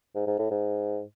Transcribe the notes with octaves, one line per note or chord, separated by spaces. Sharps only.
G#2
G#2
A2
G#2